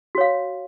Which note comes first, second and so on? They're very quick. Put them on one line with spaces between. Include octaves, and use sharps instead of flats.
F#4 C#5 F5